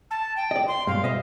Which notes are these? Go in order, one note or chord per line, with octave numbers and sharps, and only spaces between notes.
A5
G5
D5 D#5
C6
G2 B2 F5
D#5 E5